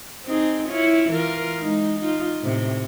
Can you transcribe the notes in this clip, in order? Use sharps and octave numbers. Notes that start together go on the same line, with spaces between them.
C4 D#4 G#4
E4 F4 C#5
E3 F4 A#4
G#3 D#4
D#4 F4
A2 C3